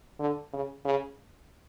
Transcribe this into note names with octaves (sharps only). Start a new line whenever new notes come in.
D3
C#3
C#3